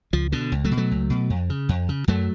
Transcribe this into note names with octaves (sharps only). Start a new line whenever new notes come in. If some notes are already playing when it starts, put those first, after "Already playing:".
C#2 F3
B2 D3
C#2
F#3 A3
B2
F#3 A3
C#2
B2
F2
C#3
F2
C#3
F#2 F#3 A3